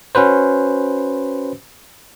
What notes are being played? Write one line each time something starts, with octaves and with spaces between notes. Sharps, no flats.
C#4 F#4 B4 C5